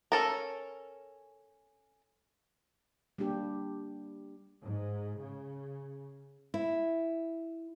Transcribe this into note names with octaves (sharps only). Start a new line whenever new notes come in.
C#4 A4 A#4
G3 A#3 D4 G4
G#2
C#3
E4